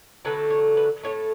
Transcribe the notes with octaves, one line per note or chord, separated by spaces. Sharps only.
D3 F#3 A3 B4
C#5
B4
A2 E3 A3 C#5